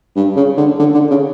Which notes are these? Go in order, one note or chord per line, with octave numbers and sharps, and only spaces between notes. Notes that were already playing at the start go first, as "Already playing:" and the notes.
G2
C#3
D3
D3
D3
C#3